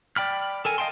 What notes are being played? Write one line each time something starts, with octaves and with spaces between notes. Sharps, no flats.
D5 G5 B5 F6
A4 A#4 G#5
D#5 F5 G5 A5 C6